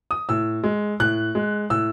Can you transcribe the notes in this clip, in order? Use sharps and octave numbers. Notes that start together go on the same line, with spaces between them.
D#6
A2 E6
G#3
A2 F#6
G#3
A2 E6